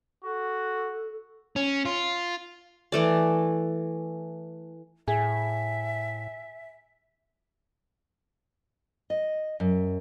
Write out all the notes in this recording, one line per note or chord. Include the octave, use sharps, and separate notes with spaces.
F#4 A4
C#4
F4
E3 A3 D5
A2 G#4 E5
D#5
F#2